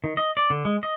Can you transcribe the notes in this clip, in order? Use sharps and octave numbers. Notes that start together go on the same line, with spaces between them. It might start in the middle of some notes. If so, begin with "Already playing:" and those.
D#3
D#5
D5
D3
G#3
D#5